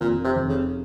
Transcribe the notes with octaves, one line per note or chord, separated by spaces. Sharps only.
F1 A#2
C3
F1
C#3